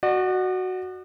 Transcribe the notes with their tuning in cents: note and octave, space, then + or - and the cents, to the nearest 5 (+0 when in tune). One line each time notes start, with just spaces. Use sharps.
F#4 +0 D5 +45